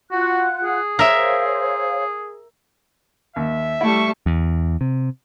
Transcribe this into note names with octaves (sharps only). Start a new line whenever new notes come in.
F4 F#4 F#5 F#6
G#4
A#4 C5 C#5 E5 F5
D#2 E5
G3 A3 E4 A5 C#6
E2
C3